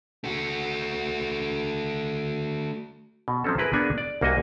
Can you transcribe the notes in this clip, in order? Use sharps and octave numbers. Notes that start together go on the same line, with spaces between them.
A3 F#4
B2
F3 F#3 C4 C#4 A4
E4 G#4 A#4 B4
A#3 B3 D4 G#4 F#5 G#5
D5
C2 A#3 F#4 D#5 G#5